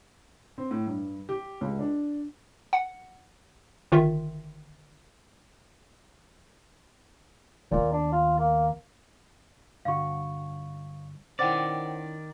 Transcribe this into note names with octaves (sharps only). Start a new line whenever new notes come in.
C4
A2
G2
G4
C#2
D4
F#5
G1 D#3 F4 E5
D#2 A#2 B3
D4
F4
A#3
G2 D3 F#4 F5 C#6
D#3 C#4 E4 C5 D5 F#5 G5